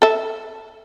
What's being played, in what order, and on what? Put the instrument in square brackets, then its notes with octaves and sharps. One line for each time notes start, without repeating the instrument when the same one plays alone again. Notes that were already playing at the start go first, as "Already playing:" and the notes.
[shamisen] A4 E5